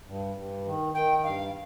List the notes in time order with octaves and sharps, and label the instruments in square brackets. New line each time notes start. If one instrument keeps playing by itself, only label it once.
[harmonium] G2
G2
D#3
[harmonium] D#3 [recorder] G5
[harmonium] G2 [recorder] F5